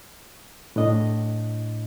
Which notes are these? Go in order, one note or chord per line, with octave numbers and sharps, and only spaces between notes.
A2 D4 D#5